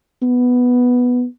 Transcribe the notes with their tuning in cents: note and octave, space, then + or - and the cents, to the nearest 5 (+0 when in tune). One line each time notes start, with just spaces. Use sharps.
B3 +0